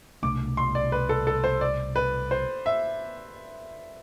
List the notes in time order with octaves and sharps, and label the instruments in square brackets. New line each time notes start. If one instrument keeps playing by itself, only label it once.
[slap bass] C2 B2 A3 D4 [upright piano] D6
[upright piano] C6
D5
B4
A4
A4
C5
D5
B4
C5
E5